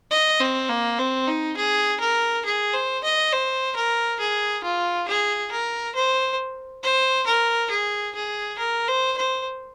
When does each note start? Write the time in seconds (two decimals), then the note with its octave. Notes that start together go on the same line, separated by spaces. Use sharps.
0.11 D#5
0.40 C4
0.69 A#3
0.99 C4
1.28 D#4
1.57 G#4
2.00 A#4
2.45 G#4
2.73 C5
3.04 D#5
3.33 C5
3.76 A#4
4.20 G#4
4.64 F4
5.08 G#4
5.52 A#4
5.95 C5
6.83 C5
7.27 A#4
7.71 G#4
8.15 G#4
8.59 A#4
8.88 C5
9.17 C5